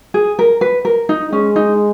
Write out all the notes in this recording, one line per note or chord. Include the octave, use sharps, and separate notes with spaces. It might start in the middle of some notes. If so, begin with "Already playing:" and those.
G#4
A#4
B4
A#4
D#4
G#3 C#4
D#4